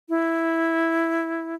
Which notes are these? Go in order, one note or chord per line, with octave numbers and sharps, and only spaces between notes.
E4